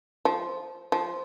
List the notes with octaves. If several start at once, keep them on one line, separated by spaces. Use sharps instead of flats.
F3
F3